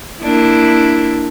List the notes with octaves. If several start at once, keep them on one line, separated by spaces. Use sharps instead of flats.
A#3 D4 E4